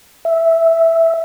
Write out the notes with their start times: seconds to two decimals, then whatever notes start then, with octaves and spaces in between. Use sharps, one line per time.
0.25 E5